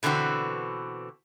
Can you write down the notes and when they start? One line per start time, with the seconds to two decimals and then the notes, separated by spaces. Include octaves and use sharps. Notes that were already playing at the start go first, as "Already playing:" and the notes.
0.03 B2 D3 E3 C4 F#4